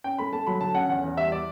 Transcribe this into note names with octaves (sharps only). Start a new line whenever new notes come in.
C#4 G5
A3 B5
A3 A5
F#3 B5
D3 A5
C#4 F#5
E2 F#5
E2
G3 E5
D5